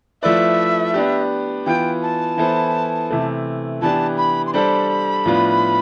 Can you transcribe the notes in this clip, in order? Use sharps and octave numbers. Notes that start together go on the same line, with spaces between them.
F3 A3 E4 B4 D5 E5
B3 D4 G4
E3 B3 F4 G5
A5
E3 B3 E4 A4 C5
C3 E3 A3
E3 B3 D4 G4 A5
B5
C6
G3 D4 A4 C5 B5
A2 F3 B3 D4 F4